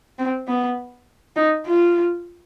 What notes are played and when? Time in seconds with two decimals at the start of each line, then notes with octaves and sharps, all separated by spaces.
0.19 C4
0.48 B3
1.36 D#4
1.66 F4